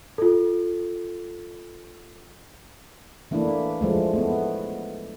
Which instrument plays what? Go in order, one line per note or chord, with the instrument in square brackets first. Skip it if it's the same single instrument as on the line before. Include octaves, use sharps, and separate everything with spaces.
[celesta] F4 A4
[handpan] E3 A3 A#3 D4 E4
F3 G#3 A3
A3 B3